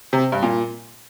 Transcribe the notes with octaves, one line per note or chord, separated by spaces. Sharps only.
C3
G2
A#2